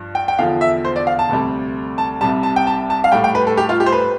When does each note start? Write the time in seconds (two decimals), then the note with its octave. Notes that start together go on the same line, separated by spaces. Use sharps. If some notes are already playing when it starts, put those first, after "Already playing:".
Already playing: G2 F3
0.15 G5
0.28 G5
0.39 E2 D3 F3 F5
0.61 E5
0.85 C5
0.96 D5
1.07 F5
1.19 A5
1.29 D2 C3 G3
1.98 A5
2.21 C2 C3 G3 A5
2.43 A5
2.56 G5
2.67 A5
2.90 A5
3.04 F5
3.12 A2 G3 G5
3.24 G5
3.35 B4
3.47 A4
3.57 G4
3.69 F4
3.80 G4
3.86 C5
3.92 B4